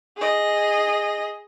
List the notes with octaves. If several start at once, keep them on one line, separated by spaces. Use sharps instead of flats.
G#4 D#5